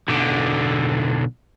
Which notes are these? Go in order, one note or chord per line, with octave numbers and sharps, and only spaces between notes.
B1 D3